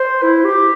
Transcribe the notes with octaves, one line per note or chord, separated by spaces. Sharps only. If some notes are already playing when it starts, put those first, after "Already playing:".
Already playing: C5
E4
G4